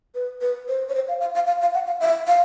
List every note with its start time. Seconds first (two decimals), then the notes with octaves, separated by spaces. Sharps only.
0.15 B4
0.41 B4
0.68 C5
0.89 C#5
0.95 C5
1.08 F5
1.21 F5
1.35 F5
1.47 F5
1.61 F5
1.74 F#5
1.87 F5
2.00 E5
2.27 F5